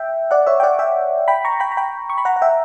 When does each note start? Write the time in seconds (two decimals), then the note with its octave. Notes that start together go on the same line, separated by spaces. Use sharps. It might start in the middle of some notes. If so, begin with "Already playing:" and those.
Already playing: E5 G5
0.31 D5 F#5
0.46 C#5 E5
0.60 G5
0.63 D5 F#5
0.79 E5 G5
1.28 G5 B5
1.45 A#5 C#6
1.60 G5 B5
1.71 A#5
1.77 G5 B5
2.10 C#6
2.18 B5
2.25 F#5 A#5
2.36 F#5
2.41 E5 G5